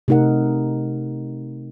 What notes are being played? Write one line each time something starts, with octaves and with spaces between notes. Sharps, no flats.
C3 A3 D#4 A#4 F#5